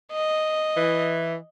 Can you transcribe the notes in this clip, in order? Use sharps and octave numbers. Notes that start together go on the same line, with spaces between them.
D#5
E3